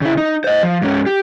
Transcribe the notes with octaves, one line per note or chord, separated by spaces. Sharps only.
C#3 E4
D#4
C5 D#5
F3
G#2 C#4
G4